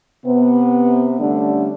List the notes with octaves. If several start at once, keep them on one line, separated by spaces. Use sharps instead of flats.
C3 B3
D3 G3 A3 C#4 D4